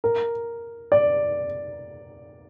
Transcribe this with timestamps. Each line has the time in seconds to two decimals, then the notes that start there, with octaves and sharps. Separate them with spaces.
0.04 A#4
0.92 D5